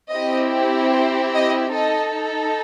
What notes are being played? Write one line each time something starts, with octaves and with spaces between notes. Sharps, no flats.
C4 E4 G4 D#5
C5
D#5
D#4 A4 D#5